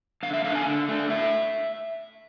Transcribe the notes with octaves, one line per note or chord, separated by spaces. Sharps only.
D3 F5
E5
A3 D4 F5
G#5
D3
A3 D4
A2 E5